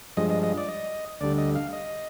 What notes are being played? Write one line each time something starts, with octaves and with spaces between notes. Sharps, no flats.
G2 F3 G#3 D#5
D#5
D#5
D5
D#5
D2 D3 G3 D5
D#5
F5
D#5